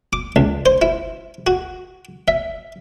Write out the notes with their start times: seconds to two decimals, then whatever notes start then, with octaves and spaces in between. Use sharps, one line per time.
0.13 D6
0.36 C#2
0.66 C5
0.82 E4
1.47 F#4
2.28 E5